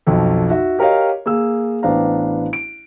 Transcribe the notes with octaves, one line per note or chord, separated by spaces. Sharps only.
B1 F2 A4
D#4 F#4 E5
G4 A#4 C#5 D#5 F5
A#3 G#4 E6
A1 B3 D4 C5 F5 A#5
D7